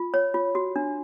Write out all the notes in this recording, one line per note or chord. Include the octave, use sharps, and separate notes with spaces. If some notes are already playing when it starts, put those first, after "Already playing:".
Already playing: F4
C#5
F4
F#4
D4